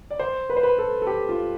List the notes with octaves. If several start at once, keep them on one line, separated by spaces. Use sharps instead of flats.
D5
C5
B4
C5
B4
A4
A4
G4
F4